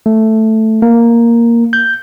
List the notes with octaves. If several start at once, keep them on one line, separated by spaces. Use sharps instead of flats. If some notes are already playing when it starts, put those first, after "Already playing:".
A3
A#3
G6